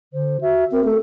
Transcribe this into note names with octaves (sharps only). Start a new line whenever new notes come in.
D3 C5
F#4 E5
C4 A#4
A3 A4